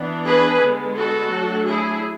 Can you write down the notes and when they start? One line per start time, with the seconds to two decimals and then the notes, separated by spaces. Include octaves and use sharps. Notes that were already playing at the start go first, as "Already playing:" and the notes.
Already playing: E3 B3 D4
0.27 G#4 B4
0.62 D3 G#3 B3
0.97 F#4 A4
1.32 F#3 A3 D4
1.68 E4 G#4